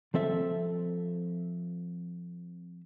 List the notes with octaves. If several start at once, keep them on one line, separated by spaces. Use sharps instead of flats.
F3 C4 A4 E5